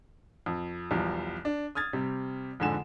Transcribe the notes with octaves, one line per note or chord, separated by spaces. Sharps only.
F2
B1 E2 F3 G3
D4
D#6 F6 G#6 A6
C3 G3
F2 G#2 D3 G#5 E7